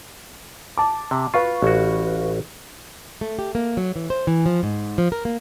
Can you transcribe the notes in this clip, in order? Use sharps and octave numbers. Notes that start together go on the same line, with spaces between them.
A5 D6
C3
F4 B4 F5 C#6
A1 F#4
A3
G4
A#3
F#3
E3
C5
E3
F3
G#2
F3
A#4
A#3